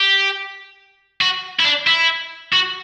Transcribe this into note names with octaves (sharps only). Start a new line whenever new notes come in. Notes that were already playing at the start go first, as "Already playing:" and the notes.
Already playing: G4
F#4
E4
D4
E4
F#4